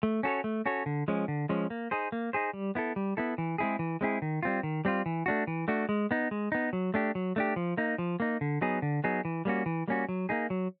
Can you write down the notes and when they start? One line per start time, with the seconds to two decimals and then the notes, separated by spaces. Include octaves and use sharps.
0.03 A3
0.23 C#4 F#4 A4 C#5
0.44 A3
0.66 C#4 F#4 A4 C#5
0.86 D3
1.08 F3 G#3 C#4
1.28 D3
1.49 F3 G#3 C#4
1.70 A#3
1.91 D#4 G#4 C5
2.12 A#3
2.33 D#4 G#4 C5
2.53 G3
2.75 B3 E4 A4
2.96 G3
3.17 B3 E4 A4
3.38 E3
3.58 G#3 C4 E4 G#4
3.79 E3
4.01 G#3 C4 E4 G#4
4.22 D#3
4.43 G3 C4 F4
4.63 D#3
4.85 G3 C4 F4
5.06 E3
5.26 A3 D4 F#4
5.47 E3
5.68 A3 D4 F#4
5.89 G#3
6.11 B3 D#4
6.31 G#3
6.52 B3 D#4
6.73 F#3
6.94 A3 D4 G4
7.15 F#3
7.36 A3 D4 G4
7.56 F3
7.77 A#3 D#4
7.98 F3
8.20 A#3 D#4
8.41 D3
8.61 F#3 B3 D#4 G#4
8.82 D3
9.04 F#3 B3 D#4 G#4
9.25 E3
9.45 G3 A#3 C#4 F#4
9.66 E3
9.88 G3 A#3 C#4 F#4
10.09 F#3
10.29 A#3 D#4 G#4
10.50 F#3